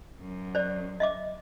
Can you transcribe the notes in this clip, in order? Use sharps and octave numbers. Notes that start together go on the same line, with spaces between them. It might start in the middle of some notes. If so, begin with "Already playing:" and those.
F#2
C5 D5
D#5 E5 D6